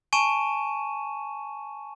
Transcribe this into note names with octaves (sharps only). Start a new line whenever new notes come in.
G#5 A5 C#6 D#7 E7